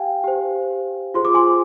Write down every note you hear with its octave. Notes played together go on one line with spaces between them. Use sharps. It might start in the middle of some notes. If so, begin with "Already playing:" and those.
Already playing: G4 F5 G5 G#5
G4 C5
F4 G#4 C5 C6
D6
G#5 C6